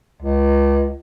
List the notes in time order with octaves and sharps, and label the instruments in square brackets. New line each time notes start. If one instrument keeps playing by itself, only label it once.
[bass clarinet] C#2